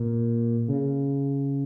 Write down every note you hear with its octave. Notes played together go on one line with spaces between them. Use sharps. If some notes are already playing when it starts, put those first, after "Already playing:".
Already playing: A#2
C#3